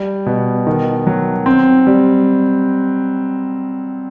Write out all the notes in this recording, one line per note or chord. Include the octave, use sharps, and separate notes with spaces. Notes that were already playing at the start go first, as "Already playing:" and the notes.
Already playing: G3
B2
D#3
F#3
C4
G3